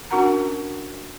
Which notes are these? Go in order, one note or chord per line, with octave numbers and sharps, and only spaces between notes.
C#4 D4 F#4 A#4 F#5 A#5